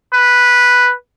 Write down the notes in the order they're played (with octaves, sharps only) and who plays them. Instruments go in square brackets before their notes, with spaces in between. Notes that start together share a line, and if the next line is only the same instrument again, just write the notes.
[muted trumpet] B4